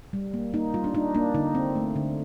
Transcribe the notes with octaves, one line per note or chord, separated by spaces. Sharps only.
G3
A#3
A#3 D#4
G3 F4
D4
D4 D#4
A#3 D4
D3 D#4
C4
A3
D3